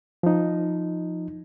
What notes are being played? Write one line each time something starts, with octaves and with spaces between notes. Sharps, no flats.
F3 D#4